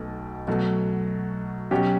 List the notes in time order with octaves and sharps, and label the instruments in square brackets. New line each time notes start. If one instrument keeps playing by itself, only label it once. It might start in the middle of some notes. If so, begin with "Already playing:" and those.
Already playing: [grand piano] B1 B2 A3
B2 F#3 A3
B2 F#3 C#4 G4